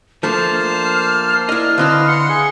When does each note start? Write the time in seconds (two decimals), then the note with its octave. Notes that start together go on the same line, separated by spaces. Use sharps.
0.23 F3 A3 A#3 D4 C5 A5 F6
1.49 D4 E4 D#5
1.78 D3 C4 E4 B4 D#5 F5
2.08 F#5 C6 C#7
2.29 G#4